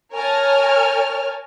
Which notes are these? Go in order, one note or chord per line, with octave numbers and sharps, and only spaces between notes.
A#4 C#5 G#5 A5 F6